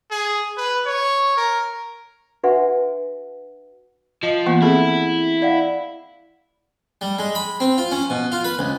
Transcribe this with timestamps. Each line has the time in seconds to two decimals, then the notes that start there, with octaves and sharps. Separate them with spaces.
0.11 G#4
0.57 B4
0.86 C#5
1.37 A#4
2.43 D4 F#4 B4 E5 F#5 G#5
4.23 F3 D#5
4.46 E3 A#3 B3 F#5
4.62 C4 E4 G#4 A4
5.42 D5 F5 F#5
7.01 G3
7.19 G#3
7.35 B5
7.60 C4
7.78 F4
7.91 C#4
8.10 B2
8.32 F4
8.44 B4
8.59 C#2